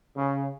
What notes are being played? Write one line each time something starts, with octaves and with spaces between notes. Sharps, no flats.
C#3